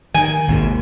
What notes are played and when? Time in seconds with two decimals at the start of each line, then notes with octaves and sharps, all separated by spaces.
0.14 D#3 G#5
0.48 G#1 D#2 C3